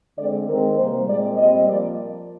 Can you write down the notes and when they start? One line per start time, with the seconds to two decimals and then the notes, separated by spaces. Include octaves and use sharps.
0.17 D3 G#3 C4 D5
0.48 D#3 G#3 C4 A#4
0.77 C3 G3 A#3 C5
1.07 A#2 G#3 C4 D5
1.38 A#2 G3 C4 D#5
1.67 F3 A#3 D5